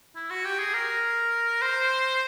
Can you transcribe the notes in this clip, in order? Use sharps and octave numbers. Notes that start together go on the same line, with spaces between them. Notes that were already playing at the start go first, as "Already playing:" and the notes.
E4
F#4
G4
G#4
A#4
C5